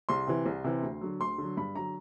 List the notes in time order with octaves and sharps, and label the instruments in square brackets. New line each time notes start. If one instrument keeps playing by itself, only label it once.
[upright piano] C2 C6
C3 E3
C2
C3 E3
D2
D3 F#3
D2 C6
D3 F#3
G2 B5
D3 F#3 A#5